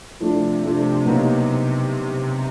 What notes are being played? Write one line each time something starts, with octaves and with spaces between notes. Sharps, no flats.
C3 F3 A3 D4
F3 A3 D4
B2 F#3 A#3 D#4